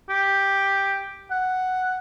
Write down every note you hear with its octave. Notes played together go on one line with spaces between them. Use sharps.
G4
F#5